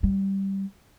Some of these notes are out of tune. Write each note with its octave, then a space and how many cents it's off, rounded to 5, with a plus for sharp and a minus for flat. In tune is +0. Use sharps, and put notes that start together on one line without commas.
G3 -10